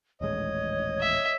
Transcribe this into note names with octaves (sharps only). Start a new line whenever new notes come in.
D#1 A1 G#3 C#5 D#5
E5